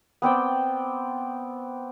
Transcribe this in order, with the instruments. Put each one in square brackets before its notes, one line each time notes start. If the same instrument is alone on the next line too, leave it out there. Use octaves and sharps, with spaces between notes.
[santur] B3 C4 D5 G5